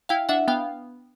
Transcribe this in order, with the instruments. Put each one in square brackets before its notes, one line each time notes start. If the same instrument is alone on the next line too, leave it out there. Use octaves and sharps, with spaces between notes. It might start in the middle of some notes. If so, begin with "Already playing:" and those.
[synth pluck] E4 F5 G5
D4 E5 F#5
B3 F5 G5